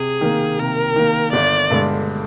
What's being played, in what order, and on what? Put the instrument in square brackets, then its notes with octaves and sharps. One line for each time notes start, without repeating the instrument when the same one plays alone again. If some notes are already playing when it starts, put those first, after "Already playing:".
Already playing: [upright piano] C3 [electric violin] G#4
[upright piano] D#3 A#3
[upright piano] C3 [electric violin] A#4
[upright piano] D#3 A#3
[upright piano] G1 [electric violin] D5
[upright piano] G2 D3 G#3